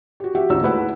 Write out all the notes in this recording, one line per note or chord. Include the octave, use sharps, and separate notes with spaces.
F#4 G4
F#4 G4 E5 F#5 G5
D2 G#2 C#4 D#4 F4 E6
G#3 A3 E4 B4 F#5